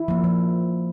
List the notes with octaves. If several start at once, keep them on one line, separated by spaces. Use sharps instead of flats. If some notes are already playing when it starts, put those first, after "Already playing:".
Already playing: E4
F3 A#3
F3